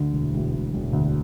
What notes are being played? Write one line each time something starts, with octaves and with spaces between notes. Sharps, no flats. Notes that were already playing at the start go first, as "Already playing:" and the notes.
Already playing: D2 D3
E1
E1
E1
E1
D2